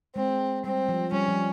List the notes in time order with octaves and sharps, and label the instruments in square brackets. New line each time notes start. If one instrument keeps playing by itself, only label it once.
[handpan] G#3 [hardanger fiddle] C4
[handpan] G3 [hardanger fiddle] C4
[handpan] F3
[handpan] G3 [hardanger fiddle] C#4
[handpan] F3